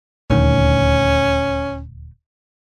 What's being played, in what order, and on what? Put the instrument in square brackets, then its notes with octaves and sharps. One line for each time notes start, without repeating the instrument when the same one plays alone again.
[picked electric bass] D#1 D2 D#3 [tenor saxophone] C#4